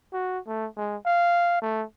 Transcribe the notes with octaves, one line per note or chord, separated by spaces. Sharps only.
F#4
A3
G#3
F5
A3